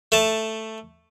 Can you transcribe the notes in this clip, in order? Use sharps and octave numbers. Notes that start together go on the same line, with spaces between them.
A3 A5